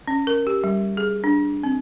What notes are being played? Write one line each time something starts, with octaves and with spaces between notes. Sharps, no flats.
C#4
A#4
G4
G3
G#4
D4
C4